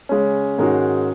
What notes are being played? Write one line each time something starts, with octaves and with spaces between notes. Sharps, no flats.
C#3 G#3 C#4
G#2 D#3 G#3 C#4 F#4